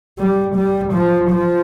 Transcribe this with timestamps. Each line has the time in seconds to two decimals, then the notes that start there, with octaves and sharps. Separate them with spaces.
0.18 G3
0.56 G3
0.93 F3
1.30 F3